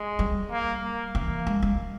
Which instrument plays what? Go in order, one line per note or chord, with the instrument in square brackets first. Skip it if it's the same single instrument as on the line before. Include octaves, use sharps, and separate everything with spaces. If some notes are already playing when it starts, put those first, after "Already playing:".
Already playing: [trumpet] G#3
[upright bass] G3
[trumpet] A#3
A#3
[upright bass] E3 [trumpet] A#3
[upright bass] G#3
G#3